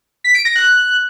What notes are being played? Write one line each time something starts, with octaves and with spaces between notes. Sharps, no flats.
B6
D7
A#6
F#6